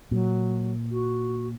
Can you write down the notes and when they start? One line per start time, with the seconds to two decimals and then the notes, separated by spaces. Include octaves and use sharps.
0.11 A#2 F#3
0.91 F#4